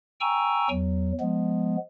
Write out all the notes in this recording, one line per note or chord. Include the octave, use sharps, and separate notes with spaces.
G5 G#5 A#5 C#6 E6
E2 F#3
F3 G#3 B3